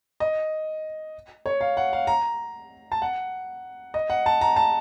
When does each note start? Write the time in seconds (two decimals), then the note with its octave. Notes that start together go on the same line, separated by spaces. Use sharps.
0.20 D#5
1.46 C#5
1.61 F5
1.77 F#5
1.93 F5
2.07 A#5
2.92 A5
3.02 F#5
3.94 D#5
4.10 F#5
4.26 A5
4.41 A#5
4.56 A5